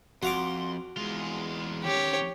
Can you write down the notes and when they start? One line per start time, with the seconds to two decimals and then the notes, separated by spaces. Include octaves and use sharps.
0.23 F2 F#4 F5 C6 D6
0.97 E2 G#3 F4
1.84 D#3 C#4 G4 C#5